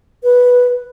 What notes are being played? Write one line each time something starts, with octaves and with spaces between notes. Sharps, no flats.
B4